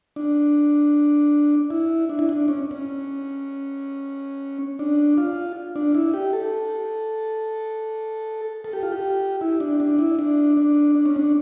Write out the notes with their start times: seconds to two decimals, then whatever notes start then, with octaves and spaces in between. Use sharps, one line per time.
0.16 D4
1.70 E4
2.09 D4
2.19 E4
2.29 D4
2.48 C#4
2.71 C#4
4.79 D4
5.18 F4
5.76 D4
5.94 E4
6.14 G4
6.33 A4
8.64 A4
8.73 G4
8.83 F4
8.92 G4
9.41 E4
9.60 D4
9.80 D4
9.99 E4
10.19 D4
10.57 D4
10.95 D4
11.06 C#4
11.16 D4